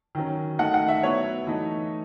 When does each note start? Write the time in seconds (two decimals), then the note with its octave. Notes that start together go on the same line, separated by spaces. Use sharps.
0.15 D#3 F#3 C#4
0.59 D#3 A3 D#4 F#5
0.74 F#5
0.88 E5
1.03 F#3 B3 E4 C#5
1.47 E3 A3 D#4